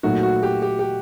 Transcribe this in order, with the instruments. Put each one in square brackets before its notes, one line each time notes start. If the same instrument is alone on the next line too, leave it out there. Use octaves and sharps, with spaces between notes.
[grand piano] A#2 F#3 A3 D#4 [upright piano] F#4
[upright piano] F#4
G4
G4
G4